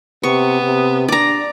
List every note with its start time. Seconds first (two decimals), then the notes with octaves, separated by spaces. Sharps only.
0.23 C3 B3 C#6
0.63 C3
1.08 D4 D5 A#5